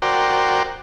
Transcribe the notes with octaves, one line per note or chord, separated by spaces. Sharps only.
F#4 A#4 C5 D5 G5